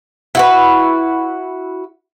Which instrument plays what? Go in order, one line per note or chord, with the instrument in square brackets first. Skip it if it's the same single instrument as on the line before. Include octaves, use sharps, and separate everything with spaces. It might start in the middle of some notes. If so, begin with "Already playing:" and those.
[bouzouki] E4 F#4 B4